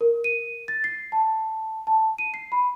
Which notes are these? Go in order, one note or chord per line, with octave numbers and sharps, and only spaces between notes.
A#4
D#7
A6
C7
A5
A5
D#7
C7
B5